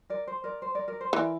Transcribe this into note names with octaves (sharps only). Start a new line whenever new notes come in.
A#4 D5
C5
A#4 D5
C5
A#4 D5
A#4 D5
C5
E3 A#4 D5